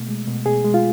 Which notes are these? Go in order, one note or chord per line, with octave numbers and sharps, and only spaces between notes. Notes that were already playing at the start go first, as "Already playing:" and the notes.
Already playing: B2 A3
G#3
B2
B2 G#4
G#3
F4